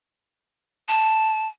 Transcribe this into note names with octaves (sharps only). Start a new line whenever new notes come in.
A5